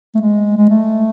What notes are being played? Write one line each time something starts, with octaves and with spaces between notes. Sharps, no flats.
A3
G#3
G#3
A3